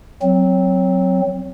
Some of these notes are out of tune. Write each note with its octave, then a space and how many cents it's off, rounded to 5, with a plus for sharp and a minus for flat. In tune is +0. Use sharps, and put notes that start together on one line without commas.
F#3 +0 C4 +0